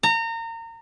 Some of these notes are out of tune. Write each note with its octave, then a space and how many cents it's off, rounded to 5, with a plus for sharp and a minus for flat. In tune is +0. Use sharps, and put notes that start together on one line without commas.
A#5 -30